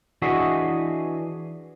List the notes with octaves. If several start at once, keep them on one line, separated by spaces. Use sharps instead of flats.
E3 D4 F#4 G#4 D#5 E5